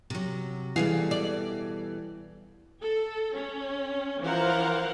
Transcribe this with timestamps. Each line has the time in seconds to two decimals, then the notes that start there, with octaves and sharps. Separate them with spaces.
0.10 C3 F#3
0.76 B2 E3 G3 G#4 A4 F5
1.11 D5
2.81 A4
3.37 C#4
4.23 E3 F3 A#4 C5 F5 F#5